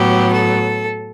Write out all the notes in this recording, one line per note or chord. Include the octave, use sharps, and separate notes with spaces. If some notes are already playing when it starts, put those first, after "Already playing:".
Already playing: A2 F#3 B3 G4
A4